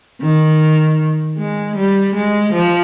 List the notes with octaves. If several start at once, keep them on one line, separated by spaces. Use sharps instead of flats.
D#3
G#3
G3
G#3
F3